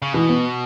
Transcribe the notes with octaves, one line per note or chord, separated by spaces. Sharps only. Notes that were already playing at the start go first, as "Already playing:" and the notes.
C#3
B2 E3
B3